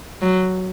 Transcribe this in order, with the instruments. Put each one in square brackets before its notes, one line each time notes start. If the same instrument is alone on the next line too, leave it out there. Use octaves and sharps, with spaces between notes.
[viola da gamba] F#3